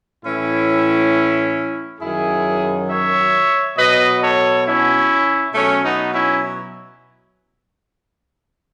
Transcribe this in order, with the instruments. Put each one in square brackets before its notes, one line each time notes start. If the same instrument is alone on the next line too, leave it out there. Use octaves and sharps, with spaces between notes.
[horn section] A2 E3 C#4 E4
F#2 D#3 F#3 E4 G#4
C#5 E5
B2 F#3 B4 D#5
A4 C#5
C#4 E4
B2 F#3 A3 C#4
B3 D#4
C#4 E4